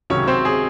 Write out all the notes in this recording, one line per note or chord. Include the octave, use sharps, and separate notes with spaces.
C#2 C3 D#3 F#3 C#4 C#5
C4 C5
G#4